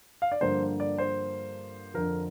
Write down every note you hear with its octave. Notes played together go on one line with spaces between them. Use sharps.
F5
D5
G2 D3 F3 A#3 C5
D5
C5
F2 D3 F3 A#4